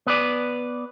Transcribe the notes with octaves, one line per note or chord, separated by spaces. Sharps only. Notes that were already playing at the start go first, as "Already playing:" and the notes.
B3 B4 D5